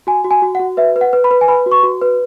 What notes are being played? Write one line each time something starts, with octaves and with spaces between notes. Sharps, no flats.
F#4 G#5
F#4
G#5
F#4
F#5
F#4
B4 E5
B4
F#5
B4
B5
B4
G#5
B4 B5
F#4
C#6
F#4
B4